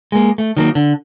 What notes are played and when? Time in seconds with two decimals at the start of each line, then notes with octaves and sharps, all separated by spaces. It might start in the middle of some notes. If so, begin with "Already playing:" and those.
0.12 G#3 A#3
0.38 A3
0.57 D#3 F#3 A#3
0.75 D3